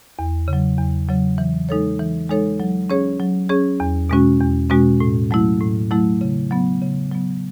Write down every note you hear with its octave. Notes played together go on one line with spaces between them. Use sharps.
E2
C#3
F#3
E2
C#3 F#3
E3
G#3 D#4 A4 C#5
E3
G#3 D#4 A4 C#5
F#3
C#4 G#4 C#5
F#3
C#4 G#4 C#5
E2
B2 G#3 C#4 F#4
E2
B2 G#3 C#4 F#4
A2
F#3 A3 E4
A2
F#3 A3 E4
C#3
F#3 B3
C#3
F#3 B3